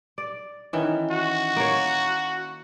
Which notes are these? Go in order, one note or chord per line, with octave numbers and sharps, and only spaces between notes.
D5
D#3 E3 C#4
F#4
A#3 C#5